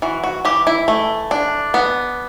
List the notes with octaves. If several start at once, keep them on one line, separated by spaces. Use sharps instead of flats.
E3 F#4
F#4
E3 G4
E4
A3
D4
B3